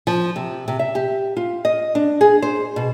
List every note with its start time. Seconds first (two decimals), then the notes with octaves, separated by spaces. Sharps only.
0.07 F3
0.36 C3
0.68 C3
0.79 E5
0.95 G4
1.37 F4
1.65 D#5
1.95 D4
2.21 G#4
2.42 C5
2.76 B2